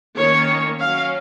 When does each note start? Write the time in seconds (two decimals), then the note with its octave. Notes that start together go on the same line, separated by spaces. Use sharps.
0.17 D#3 A#3 C#4 C#5
0.78 F#3 C#4 F5